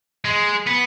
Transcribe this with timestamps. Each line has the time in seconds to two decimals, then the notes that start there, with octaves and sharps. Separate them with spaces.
0.25 G#3
0.67 B3